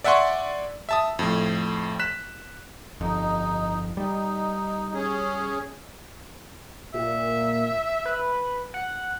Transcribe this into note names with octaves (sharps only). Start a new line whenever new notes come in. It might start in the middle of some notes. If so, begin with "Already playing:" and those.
D5 E5 F#5 G#5 C6 C#6
E5 A5 D#6
F2 A2
F#6 B6 E7
G1 F2 D#4
G3 D#4
C#4 G#4
A#2 E5
B4
F#5